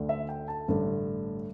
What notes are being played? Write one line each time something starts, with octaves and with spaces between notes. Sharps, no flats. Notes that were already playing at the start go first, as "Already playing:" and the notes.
Already playing: D2 D3 A3
E5
G5
A5
A1 G2 D3 A3